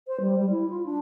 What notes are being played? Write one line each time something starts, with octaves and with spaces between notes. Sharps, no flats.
C5
G3
G3
E4
F4
D4